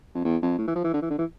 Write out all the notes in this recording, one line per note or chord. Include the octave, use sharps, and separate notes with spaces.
F2
E2
F2
A2
E3
F3
E3
D3
E3
D3
E3